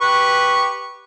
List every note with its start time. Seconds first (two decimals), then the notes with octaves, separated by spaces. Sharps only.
0.01 G4 B4 C#6